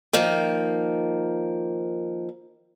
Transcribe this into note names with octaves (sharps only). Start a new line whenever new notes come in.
D#3 F3 A#3